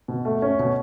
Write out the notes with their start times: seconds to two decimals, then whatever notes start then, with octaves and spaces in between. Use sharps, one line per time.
0.08 B2
0.25 A3
0.42 C#4
0.59 B2